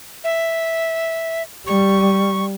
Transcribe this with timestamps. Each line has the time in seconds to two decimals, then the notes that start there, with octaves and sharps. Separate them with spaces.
0.24 E5
1.67 G3 C#6